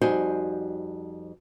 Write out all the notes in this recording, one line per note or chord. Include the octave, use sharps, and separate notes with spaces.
F2 G3 D#4 F#4 C5 G#5